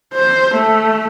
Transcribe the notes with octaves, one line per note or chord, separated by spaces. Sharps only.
C5
A3